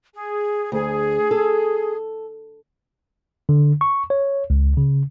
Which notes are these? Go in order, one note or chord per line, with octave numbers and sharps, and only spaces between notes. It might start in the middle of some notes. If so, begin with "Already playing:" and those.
G#4
D2 G#4
A4
D3
C#6
C#5
C#2
C#3